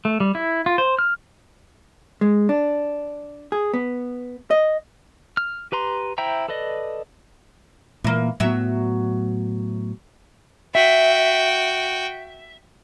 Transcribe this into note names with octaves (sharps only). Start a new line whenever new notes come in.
A3
G3
E4
F4
C5
F6
G#3
D4
G#4
B3
D#5
F6
G4 B4 A#5 C6
E4 C5 E5 G5 A#5
A4 B4 D5 D#5
A#2 E3 A#3
A2 F#3 B3 E5
F#4 E5 G5